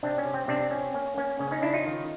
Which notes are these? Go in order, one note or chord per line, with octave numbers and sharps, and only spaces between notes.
C3 C4 D4
C#4
C3
C4
C3 C4 D4
C4 C#4
A#3 C#4
A#3 C#4
C#3 C#4
C#4 D#4
C#3 D4 E4
D#4 F4
D#3